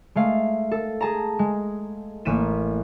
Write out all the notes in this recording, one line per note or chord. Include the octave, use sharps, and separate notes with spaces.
G#3 A3 F5
A4
G#4 A5 A#5
G#3
A1 A#3 B6 D#7 E7